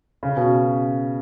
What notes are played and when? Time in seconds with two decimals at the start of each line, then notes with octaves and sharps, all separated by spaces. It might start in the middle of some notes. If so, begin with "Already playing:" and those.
0.23 C#3
0.37 B2